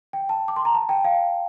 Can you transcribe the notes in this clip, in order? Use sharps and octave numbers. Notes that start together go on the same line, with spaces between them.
G5
A5
D6
C6
A#5
A5
G5
F5